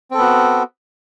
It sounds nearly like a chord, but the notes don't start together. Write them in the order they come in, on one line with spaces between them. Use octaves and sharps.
C4 A4 B3 F#4